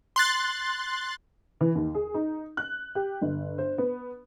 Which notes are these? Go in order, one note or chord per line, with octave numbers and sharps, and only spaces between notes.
C6 F#6 A6
E3
D#2
G#4
D#4
F#6
G4
G1
C5
B3